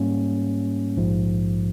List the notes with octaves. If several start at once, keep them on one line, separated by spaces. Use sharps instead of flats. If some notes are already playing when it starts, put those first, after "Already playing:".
Already playing: G#2 G3 A#3 C#4
A#1 G#2 F3